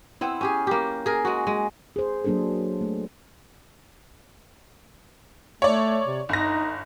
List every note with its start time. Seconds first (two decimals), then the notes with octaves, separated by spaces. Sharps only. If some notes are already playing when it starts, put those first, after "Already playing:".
0.21 B3 C4 E4
0.41 C#4 G4 G#4
0.67 A#3 G4
1.06 G#4 A#4
1.25 G#3 F#4
1.47 G#3
1.96 G#4 C5
2.25 F#3 A#3 D4 G#4 A4
2.81 A3
5.62 A3 C#5 D5
6.07 C3
6.29 G1 D#4 A#6